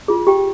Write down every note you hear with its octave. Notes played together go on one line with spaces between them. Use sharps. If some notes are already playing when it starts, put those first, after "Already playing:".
F4 G#4
G4 G5